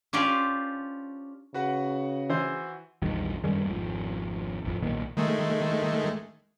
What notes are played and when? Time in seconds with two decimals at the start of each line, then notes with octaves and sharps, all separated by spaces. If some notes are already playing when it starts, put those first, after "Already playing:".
0.13 C#4 D4 F4 G4 C5 D5
1.54 C#3 F#4 B4 F#5
2.29 E3 C5
3.02 A#1 E2 G2 D#3
3.44 F#2 D#3 G3 G#3
3.66 G#1 F2
4.64 G#1 F2
4.82 B1 A#2 D#3
5.17 D#3 G#3 A3